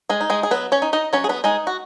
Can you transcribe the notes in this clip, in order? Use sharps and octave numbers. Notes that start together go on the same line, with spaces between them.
G#3 G#4
D#4
G#3 G#4
G#4
F#3 B3 B4
C#4 C#5
D#4
D#4 D#5
F#3 C#4 C#5
G#4
B3 B4
G#3 D#4 G#4
F#4